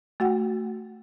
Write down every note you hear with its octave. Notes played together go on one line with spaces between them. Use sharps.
A3 F#4 F#5 G5